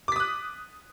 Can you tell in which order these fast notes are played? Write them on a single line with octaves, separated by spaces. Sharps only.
D6 B6 D#6 F#6